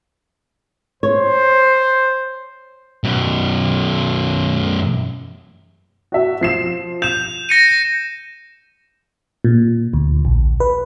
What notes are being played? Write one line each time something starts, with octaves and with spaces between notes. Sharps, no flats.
C5 C#5
F#2 B2
F#4 E5
F3 C7 E7
G6 E7 F7
A#6 C#7 D#7
A#2
D2
A#1
B4